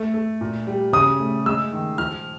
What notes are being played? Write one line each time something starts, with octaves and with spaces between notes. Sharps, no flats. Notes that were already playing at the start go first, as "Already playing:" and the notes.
Already playing: A3
A3
A#2
G3
C#3 D#6
A3
G#3 E6
D#3
F3 F6